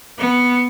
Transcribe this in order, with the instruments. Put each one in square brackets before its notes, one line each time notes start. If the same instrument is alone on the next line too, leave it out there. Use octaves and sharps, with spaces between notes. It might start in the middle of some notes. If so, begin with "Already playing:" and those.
[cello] B3